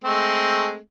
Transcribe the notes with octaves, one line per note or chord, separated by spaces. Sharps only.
G#3 A3 C4